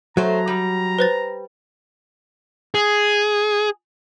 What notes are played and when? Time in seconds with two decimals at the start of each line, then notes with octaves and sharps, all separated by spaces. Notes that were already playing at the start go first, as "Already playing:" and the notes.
0.17 F#3 A3 C5 A#5
0.48 G3
0.99 B4 C5 A6
2.75 G#4